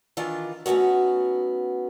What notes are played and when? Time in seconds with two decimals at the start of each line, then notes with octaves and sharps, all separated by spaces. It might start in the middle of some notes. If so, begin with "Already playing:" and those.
0.17 D#3 E3 D4 F4
0.66 A3 B3 C#4 D#4 F#4